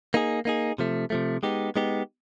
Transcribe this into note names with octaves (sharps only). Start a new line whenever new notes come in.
A#3 D#4 G#4
A#3 D#4 G#4
C3 F3 A3
C3 F3 A3
G#3 B3 D#4 G4
G#3 B3 D#4 G4